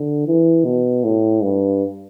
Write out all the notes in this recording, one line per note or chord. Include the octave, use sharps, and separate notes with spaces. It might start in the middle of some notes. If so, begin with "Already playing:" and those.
Already playing: D3
E3
B2
A2
G2